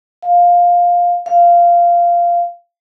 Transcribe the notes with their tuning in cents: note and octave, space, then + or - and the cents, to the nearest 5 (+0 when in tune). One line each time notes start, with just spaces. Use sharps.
F5 +10
F5 -10